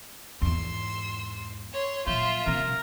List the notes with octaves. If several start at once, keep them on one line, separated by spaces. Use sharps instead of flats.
E2 G#2 C6 E6
C#5 C6
A#2 F#3 F4 E5 C6
C3 G3 A#4